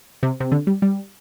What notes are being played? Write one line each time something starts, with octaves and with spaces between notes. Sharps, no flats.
C3
C3
D3
G3
G3